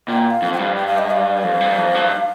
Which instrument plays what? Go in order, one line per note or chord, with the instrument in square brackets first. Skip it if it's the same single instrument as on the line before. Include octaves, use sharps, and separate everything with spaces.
[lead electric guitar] A#2 [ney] G5
[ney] F5
[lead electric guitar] F2
[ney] G5
[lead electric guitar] G2 [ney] F5
[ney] G5
F5
D#5
F5
[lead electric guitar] F2
G2
F2
G2